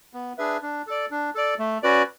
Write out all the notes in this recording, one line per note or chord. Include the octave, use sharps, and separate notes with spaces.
B3
D4 G#4 B4 E5
D4
A4 D5
D4
A4 D5
A3
C#4 F#4 B4 D5